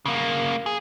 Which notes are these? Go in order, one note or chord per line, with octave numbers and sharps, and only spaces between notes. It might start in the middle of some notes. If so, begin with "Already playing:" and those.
C#3 A#3
G#4